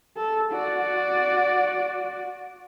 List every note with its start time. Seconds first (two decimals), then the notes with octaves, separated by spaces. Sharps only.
0.17 A4
0.52 F#4 D5